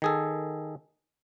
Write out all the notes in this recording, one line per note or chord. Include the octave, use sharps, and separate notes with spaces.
D#3 G#4 A4